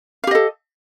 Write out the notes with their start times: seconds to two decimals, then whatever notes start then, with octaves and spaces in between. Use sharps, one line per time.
0.24 F5
0.27 G4
0.31 D#5
0.35 A4